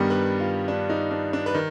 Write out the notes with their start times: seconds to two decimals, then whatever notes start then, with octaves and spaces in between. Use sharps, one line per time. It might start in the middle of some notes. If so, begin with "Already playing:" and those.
Already playing: G2 D#3 G3 B3 G4
0.10 B4
0.40 F4
0.68 D4
0.89 D#4
1.11 D4
1.33 D4
1.46 B4
1.54 D#3